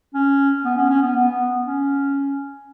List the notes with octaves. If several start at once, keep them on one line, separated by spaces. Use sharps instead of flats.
C#4
B3
C#4
C#4
B3
B3
C#4